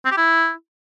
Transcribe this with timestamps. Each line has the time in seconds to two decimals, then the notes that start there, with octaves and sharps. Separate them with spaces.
0.05 C4
0.11 G4
0.17 E4